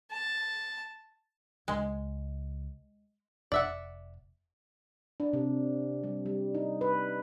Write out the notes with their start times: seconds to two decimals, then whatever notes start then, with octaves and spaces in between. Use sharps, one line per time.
0.11 A5
1.68 C#2 G#3
3.52 F1 D5 E5 F#5
5.20 D4
5.33 C3
6.04 G3
6.26 G3
6.55 D#4
6.81 B4